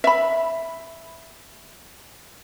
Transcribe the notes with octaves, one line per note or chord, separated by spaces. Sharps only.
E5 B5